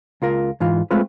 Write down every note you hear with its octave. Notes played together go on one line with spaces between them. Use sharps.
C#2 F4 A#4
G#2 E3 F4
G#3 A3 C4 F4 B4